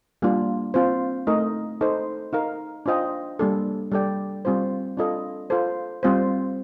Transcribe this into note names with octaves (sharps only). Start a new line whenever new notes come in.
G3 A#3 D4 F4
C4 F4 C5
A3 D#4 A#4 D#5
D#4 A4 C5
D#4 A#4 F5
D4 F4 C5 D#5 G5
G3 A#3 D4 A4
G3 D4 A4 D5 G5
G3 C4 F4 C5
D4 F4 A4 D#5
F4 A4 C5
G3 C4 F4 C5